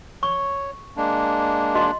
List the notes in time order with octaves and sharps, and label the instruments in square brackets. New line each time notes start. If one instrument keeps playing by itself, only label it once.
[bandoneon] C#5 [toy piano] C#6
[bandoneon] G#3 A#3 D4
[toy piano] F#4 D#5 C6